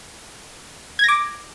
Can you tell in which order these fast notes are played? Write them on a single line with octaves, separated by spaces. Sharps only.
G#6 A#6 D6